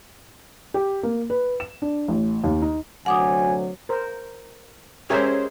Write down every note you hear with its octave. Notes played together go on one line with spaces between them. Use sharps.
G4
A#3
B4
E7
D4
A1
D#2
D#4
D2 C3 F#3 F#5 G#5 D6 D#6
A#4 C5
G#3 C#4 G4 G#4 A#4 C5 C#5 E5